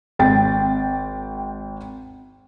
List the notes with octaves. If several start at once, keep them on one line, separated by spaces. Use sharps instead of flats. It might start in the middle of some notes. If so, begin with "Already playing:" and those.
G#1 G5 A6